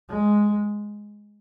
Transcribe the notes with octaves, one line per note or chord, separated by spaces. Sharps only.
G#3